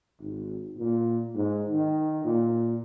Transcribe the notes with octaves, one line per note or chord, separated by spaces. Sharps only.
G#1
A#2
G#2
D#3
A#2